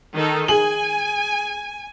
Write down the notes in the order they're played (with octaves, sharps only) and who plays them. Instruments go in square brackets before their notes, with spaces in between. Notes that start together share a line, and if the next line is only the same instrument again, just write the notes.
[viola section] D#3 D#4 A4
[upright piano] G#4 F#7 [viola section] G#5